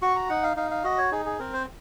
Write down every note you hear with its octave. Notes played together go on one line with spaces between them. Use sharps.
F#4 C#6
A#5
D#4 F#5
F5
D#4 F5
F5
F#4 D#5
C#5
D#4 G#4
G#4
C4 A#4
C5